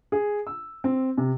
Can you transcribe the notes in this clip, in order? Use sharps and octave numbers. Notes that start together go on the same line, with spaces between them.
G#4
E6
C4
C3